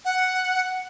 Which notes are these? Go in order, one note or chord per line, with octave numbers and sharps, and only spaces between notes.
F#5